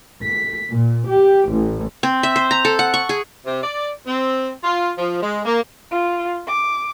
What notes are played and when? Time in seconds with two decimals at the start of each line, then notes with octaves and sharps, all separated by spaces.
0.23 B6
0.69 A#2
1.08 G4
1.50 A1
2.03 C4
2.23 E5
2.36 C5
2.51 A#5
2.65 A4
2.79 F#5
2.94 C#6
3.09 G#4
3.46 C3
3.63 D5
4.07 C4
4.64 F4
4.98 F3
5.22 G#3
5.45 A#3
5.91 F4
6.47 D6